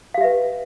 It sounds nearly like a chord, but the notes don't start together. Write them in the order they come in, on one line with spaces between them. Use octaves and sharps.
F5 G4 E5 B4